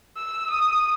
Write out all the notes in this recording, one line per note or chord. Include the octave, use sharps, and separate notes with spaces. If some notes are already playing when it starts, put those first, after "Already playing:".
E6
D#6